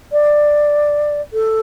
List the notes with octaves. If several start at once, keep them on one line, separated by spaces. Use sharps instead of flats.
D5
A4